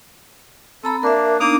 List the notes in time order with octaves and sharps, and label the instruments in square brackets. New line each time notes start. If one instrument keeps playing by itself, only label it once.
[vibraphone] C4 A#5 B5 [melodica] A4
[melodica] A#3 D4 [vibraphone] A#4 E5
[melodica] A#3 D6 D#6 [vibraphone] B3 D4 D#4